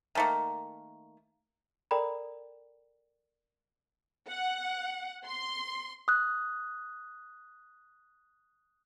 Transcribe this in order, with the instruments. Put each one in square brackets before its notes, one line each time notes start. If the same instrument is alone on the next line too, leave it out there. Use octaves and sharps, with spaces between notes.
[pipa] D#3 A3 A#3
[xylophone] A4 A#4 D5 G5 A#5 B5
[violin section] F#5
C6
[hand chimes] D#6 F#6